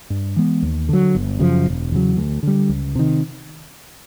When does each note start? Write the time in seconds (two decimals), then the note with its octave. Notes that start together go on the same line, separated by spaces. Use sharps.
0.10 G2
0.36 E3 G#3 B3
0.62 D#2
0.89 D3 F#3
1.15 G1
1.40 F#2 C#3 F3
1.66 E1
1.91 E2 C#3 F#3
2.17 D2
2.43 D3 G3
2.69 C#2
2.95 C3 D#3